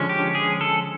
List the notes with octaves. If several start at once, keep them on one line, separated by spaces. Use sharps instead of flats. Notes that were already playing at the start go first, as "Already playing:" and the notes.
Already playing: D3 F3 G#3 C#4
G4
G#4
A4